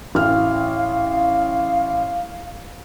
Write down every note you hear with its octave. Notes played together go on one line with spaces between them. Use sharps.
A1 F5 F6